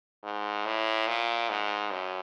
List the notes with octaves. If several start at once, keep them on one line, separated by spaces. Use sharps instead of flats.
G#2
A2
A#2
G#2
F#2